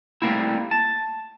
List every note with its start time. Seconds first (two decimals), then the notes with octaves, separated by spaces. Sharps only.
0.22 G3 A3 A#3 C4 E4
0.71 A5